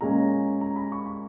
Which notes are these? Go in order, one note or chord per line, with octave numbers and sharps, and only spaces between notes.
A#2 G#3 C#4 A#5
A#5
B5
C#6
B5